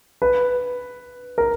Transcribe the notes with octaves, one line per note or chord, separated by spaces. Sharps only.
B4
A#4